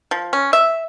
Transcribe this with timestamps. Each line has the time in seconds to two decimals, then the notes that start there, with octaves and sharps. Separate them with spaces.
0.11 F3
0.33 C#4
0.53 E5